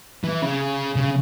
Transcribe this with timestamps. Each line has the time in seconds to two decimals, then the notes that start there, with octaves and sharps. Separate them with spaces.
0.24 E3
0.42 C#3
0.96 C#3